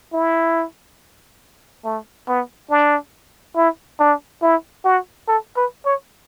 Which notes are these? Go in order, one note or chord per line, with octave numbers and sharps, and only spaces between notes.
E4
A3
B3
D4
E4
D4
E4
F#4
A4
B4
C#5